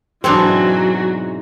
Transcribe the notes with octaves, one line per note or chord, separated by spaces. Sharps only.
G#2 B2 E3 F#3 C4 D4 F#4